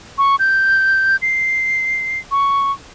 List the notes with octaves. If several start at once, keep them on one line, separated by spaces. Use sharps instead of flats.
C#6
G6
C7
C#6